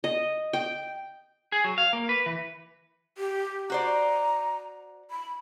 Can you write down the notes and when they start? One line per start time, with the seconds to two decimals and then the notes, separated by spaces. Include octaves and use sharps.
0.04 D#5
0.53 G5
1.52 G#4
1.64 F#3
1.78 F5
1.93 A#3
2.09 B4
2.26 E3
3.18 G4
3.70 F#4 C5 D5 A#5
5.11 B5